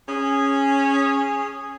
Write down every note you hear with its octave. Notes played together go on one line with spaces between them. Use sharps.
C#4 G#4